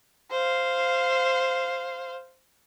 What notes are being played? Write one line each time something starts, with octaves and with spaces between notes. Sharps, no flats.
C5 F5